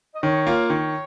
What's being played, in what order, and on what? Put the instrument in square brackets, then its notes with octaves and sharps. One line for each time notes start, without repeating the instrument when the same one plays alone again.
[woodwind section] D#5
[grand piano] D#3 [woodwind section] C#5
[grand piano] A#3 F4
[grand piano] D#3 [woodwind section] C#5